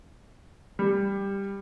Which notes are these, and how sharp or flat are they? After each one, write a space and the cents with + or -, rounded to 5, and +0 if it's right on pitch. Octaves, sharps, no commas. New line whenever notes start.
G3 +10